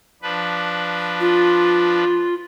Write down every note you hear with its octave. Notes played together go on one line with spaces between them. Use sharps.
F3 D4 B4
F4